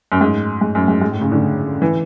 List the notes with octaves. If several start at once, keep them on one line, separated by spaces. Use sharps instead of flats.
F#2
G#2
G#2
F#2
G#2
G#2
A2
C#3
D3
E3